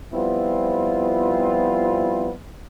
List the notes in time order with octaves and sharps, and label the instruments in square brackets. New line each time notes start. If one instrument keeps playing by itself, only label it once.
[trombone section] F3 G3 B3 C4 E4 F4